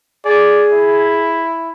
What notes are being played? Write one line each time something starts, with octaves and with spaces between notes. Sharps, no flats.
G#4 D5
E4